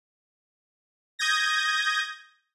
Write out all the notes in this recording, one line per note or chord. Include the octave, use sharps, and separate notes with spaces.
D#6 G6 G#6 A#6